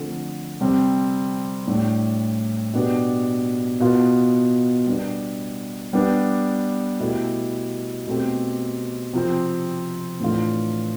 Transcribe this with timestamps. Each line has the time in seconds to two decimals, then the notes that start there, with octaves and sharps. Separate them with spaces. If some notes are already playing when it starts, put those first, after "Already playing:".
Already playing: D3 F3 A3 C4
0.61 C3 G3 C4
1.67 A2 G3 D4
2.74 B2 B3 D4 G4
3.80 B2 B3 F4
4.87 G3 B3 D4
5.93 G3 B3 D4 G4
7.00 B2 A3 E4 G4
8.07 B2 A3 C4 G4
9.13 C3 F3 C4
10.20 A2 E3 A3 D4 F4